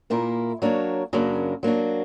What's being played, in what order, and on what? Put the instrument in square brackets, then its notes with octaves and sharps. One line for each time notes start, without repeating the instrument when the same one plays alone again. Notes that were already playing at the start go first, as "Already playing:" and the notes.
[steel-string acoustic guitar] A#2 A#3 E4 A#4
F#3 A#3 D4 F#4 C#5
F#2 C#3 F#3 A#3 D4
F#3 A#3 D4 F#4